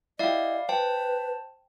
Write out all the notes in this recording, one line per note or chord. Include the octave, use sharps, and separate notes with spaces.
E4 G4 D5 D#5 F5
B4 C5 G5 A5